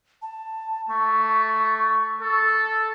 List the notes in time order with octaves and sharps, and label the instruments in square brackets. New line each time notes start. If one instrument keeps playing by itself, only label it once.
[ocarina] A5
[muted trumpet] A3 [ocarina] C#6
[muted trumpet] A4